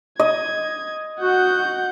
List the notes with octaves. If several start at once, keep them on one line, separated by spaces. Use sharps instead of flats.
D#5 G#6
F#4 F#5 G6